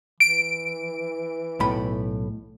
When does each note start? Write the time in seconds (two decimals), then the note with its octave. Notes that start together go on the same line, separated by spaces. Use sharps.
0.20 E3 D7
1.60 B1 A2 B5